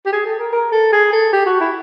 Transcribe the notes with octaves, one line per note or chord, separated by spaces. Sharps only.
G4
G#4
A4
A#4
A#4
A4
G#4
A4
G4
F#4
E4